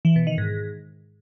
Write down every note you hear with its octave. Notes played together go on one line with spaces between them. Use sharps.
E3
B2
D#3
G#2